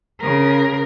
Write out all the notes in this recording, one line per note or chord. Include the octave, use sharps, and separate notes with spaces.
C#3 A#4